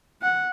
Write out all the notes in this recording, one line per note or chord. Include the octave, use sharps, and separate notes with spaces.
F#5